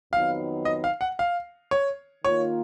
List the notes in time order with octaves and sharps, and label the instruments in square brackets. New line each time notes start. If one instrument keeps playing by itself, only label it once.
[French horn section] F2 D#3 F#3 B3 [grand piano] F5
[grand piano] D#5
F5
F#5
F5
C#5
[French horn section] D#3 A#3 F4 [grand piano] C#5